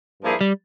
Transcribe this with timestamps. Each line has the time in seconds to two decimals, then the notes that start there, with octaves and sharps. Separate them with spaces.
0.22 G2 F3 A#3 E4 G#4
0.41 G3